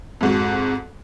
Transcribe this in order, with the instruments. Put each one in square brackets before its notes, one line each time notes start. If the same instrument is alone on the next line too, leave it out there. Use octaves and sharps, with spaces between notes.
[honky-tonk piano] F2 G#2 F#4